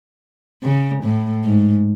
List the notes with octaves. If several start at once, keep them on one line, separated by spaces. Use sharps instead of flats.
C#3
A2
G#2